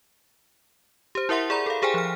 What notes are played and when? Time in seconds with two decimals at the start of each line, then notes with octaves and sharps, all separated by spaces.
1.15 G4 C5
1.29 E4 A#4 E5 F#5 C6
1.50 G#4 D5 A#5 B5
1.66 A4 F5
1.82 G4 G#4 C5 G5 G#5
1.94 F3 F6